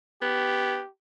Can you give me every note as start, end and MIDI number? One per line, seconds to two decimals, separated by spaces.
0.22 0.79 59
0.22 0.89 67